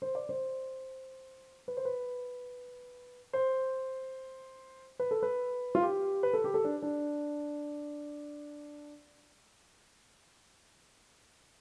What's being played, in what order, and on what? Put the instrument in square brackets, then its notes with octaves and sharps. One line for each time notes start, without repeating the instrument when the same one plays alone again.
[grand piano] C5
D5
C5
B4
C5
B4
C5
B4
A4
B4
F4
G4
B4
A4
G4
A4
D4
D4